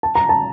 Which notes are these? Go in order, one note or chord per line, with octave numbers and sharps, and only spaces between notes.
A5
A#5
A5